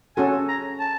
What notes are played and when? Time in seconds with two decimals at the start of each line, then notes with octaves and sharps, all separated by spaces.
0.16 C#4 F#4 A4 G#5
0.49 A#5
0.80 A5